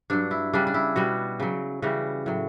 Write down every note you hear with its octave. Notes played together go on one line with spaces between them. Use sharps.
G2 F#3 D4
E4
C#3 G3 D4
D4
E4
B2 G3 F#4
C#3 F#3
C#3 E3 G3 F#4
A2 F#3